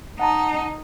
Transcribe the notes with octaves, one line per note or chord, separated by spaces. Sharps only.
D#4 F#5 A5 A#5